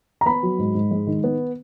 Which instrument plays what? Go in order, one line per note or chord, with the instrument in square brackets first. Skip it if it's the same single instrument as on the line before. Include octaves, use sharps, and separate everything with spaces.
[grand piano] A#5
B3 B5
F#3
G#2
G#2
G#3
D#3
B3